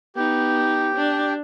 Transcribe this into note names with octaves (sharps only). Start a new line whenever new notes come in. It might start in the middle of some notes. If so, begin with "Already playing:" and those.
B3 D#4 G4
D4